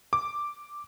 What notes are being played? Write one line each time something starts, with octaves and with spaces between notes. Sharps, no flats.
D6